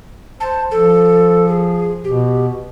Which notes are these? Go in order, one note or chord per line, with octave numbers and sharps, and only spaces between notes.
C5 A5
F3 A4
G#4
B2 G4